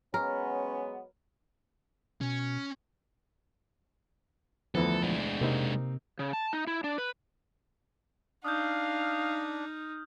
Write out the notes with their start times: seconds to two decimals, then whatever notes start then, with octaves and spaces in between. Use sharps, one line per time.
0.14 F#3 G#3 B3 C#4 A#4
2.21 B2 C#4
4.75 D2 E3 F3 B3 A4
5.03 G#3 D4
5.41 C3 A#3 C4 D#4
6.19 C#3
6.33 A5
6.53 D#4
6.67 E4
6.84 D4
6.98 B4
8.45 D4 D#4 F5 D#6 F6 G6